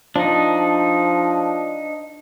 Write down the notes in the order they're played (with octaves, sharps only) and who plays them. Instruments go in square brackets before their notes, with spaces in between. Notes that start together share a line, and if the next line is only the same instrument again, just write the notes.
[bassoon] F3 [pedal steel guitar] D4 D#4